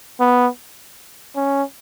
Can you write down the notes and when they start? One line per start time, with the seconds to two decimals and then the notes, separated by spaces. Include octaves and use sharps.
0.20 B3
1.36 C#4